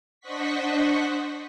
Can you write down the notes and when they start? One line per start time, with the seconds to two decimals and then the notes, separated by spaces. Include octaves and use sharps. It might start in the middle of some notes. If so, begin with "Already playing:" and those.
0.20 D4 C5 D#5 F#5 C#6 B6